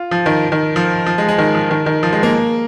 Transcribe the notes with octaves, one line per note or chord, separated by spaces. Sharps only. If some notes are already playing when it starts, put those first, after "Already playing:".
Already playing: F4
F3
D#3
D#3
F3
F3
G#3
G#3
D#3
F3
D#3
D#3
F3
G#3
A#3